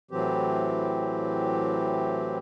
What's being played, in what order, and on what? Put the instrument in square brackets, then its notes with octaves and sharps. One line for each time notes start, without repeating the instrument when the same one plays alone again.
[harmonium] A2 E3 F#3 C4 G4